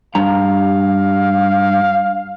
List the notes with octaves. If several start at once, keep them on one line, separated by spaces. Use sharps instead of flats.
G2 F5 A#5